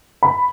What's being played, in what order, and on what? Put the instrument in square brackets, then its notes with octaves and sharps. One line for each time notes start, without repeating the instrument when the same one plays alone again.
[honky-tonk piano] B5